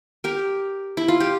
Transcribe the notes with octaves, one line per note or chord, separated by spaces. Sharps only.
G4 A#4
E4
F4
G4